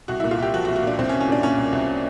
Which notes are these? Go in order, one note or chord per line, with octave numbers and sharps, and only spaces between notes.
C2 F#4
A#2 E4
F4
C2 G4
F3 F#4
F#4
C2
F#4
A#2 D4
C2 C4
C#4
C2
C#4
A#2 D4
A#2 C#4
C2
C2